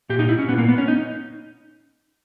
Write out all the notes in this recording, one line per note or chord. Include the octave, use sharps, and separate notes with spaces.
A#2 G4
D#4
E4
C#4
A#2 B3
A#3
B3
C#4
D#4